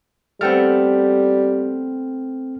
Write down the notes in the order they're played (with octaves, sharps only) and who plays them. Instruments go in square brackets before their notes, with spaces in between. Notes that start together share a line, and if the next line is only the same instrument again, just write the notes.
[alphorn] G3 [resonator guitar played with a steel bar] A3 B3 [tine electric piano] C4 G5 F6